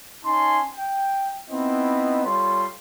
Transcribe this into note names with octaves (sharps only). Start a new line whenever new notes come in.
C#4 D#4 G#5 A5 C6
G5
B3 C4 D#4 E4 D#5
G3 F4 A4 C#5 C6